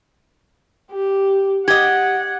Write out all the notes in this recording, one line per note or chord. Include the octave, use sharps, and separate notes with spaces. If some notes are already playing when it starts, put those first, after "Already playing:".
G4
G4 D#5 F#5 G#6